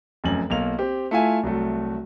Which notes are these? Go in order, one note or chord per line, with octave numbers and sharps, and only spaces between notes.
F1 F#2 F#7
B1 A#3 F7
C4 G4
A3 E4 F4 E5 G#5
C2 F#3 A3